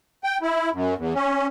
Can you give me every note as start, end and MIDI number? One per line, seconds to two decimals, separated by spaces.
0.24 0.38 79
0.42 0.70 64
0.73 0.94 42
0.98 1.13 40
1.15 1.47 61